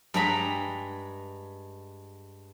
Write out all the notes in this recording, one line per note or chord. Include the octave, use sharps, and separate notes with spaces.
G2 G#3 F#5 G5 A#5 B5